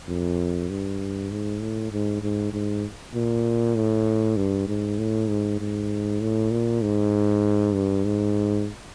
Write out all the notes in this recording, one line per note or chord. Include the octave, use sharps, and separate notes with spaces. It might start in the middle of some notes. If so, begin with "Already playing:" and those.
F2
G2
G#2
A2
G#2
G#2
G#2
A#2
A2
G2
G#2
A2
G#2
G#2
A2
A#2
G#2
G2
G#2